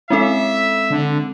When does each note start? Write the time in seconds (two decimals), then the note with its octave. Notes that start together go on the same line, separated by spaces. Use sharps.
0.10 G#3 C4 C#4 E4 A4 E5
0.90 D3